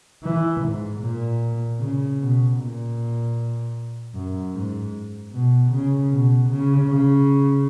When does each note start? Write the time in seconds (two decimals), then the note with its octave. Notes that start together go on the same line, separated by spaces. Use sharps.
0.23 E3
0.62 G#2
1.01 A#2
1.79 C#3
2.19 B2
2.58 A#2
4.14 F#2
4.54 G#2
5.32 B2
5.71 C#3
6.10 B2
6.50 C#3
6.89 C#3